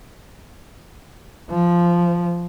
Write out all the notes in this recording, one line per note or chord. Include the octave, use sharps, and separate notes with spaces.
F3